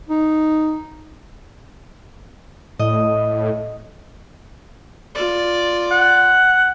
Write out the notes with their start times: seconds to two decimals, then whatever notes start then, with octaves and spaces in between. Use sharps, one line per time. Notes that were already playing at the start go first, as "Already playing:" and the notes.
0.09 D#4
2.79 A2 D#5
5.15 F4 D5
5.91 F#5